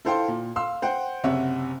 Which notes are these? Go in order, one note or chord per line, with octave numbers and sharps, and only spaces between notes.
E4 A4 C5 F5 G5 C6
A#2
F5 C6 E6
C5 F#5 G5
F#1 C3 C#5 E5 F#5